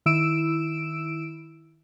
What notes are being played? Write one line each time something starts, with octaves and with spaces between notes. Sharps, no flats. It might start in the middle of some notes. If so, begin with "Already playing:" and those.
D#3 E4 E6 D7 E7